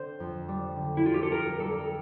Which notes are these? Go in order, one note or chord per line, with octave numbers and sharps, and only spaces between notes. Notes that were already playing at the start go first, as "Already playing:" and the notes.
Already playing: D3 C4 C5
F2
G3
D3
E4
C4 F4
G4
A4
F2 A#4
G3 A4